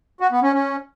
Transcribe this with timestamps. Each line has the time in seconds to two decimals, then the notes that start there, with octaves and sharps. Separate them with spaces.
0.20 F#4
0.31 B3
0.42 C#4
0.53 C#4